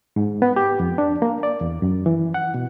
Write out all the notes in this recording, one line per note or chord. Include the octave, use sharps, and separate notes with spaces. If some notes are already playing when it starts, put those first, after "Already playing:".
G#2
B3
G4
F2
D4
A#3
D5
E2
F#2
E3
F#5
B2